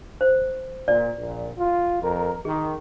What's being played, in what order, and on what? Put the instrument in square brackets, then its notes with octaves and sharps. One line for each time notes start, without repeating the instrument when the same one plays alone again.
[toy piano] C5
[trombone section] A#2 [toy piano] D5
[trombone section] A#1 A#2
F4
F2 A#4
[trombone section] D#3 [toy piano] G#4